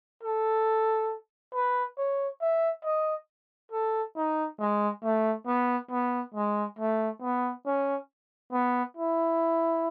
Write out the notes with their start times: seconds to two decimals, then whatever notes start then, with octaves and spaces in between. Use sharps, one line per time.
0.23 A4
1.54 B4
1.98 C#5
2.41 E5
2.85 D#5
3.72 A4
4.16 D#4
4.59 G#3
5.03 A3
5.47 B3
5.91 B3
6.34 G#3
6.79 A3
7.22 B3
7.66 C#4
8.52 B3
8.97 E4